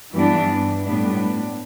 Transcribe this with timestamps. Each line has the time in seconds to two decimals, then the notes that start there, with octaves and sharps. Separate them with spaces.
0.12 G2 E3 G3 B3 D4
0.84 A2 G3 B3 D4